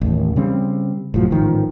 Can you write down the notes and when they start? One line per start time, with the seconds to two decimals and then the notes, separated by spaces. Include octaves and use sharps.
0.01 A1 D#2
0.36 C#3 G3 C4
1.14 F1 A2 F3 F#3
1.31 A1 G#2 D#3 F3